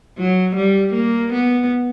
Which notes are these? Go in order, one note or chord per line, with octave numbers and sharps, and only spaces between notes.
F#3
G3
A#3
B3